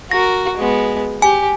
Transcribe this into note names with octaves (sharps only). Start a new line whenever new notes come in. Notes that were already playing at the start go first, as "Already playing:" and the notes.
F#4 A#4 A#6
G#3 B3
G4 G#5